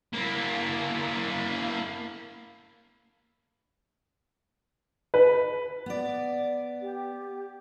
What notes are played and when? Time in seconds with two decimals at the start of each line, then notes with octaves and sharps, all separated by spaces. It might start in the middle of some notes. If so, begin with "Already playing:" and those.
0.13 A#3 E4
5.14 B4
5.86 B3 D5
6.81 G4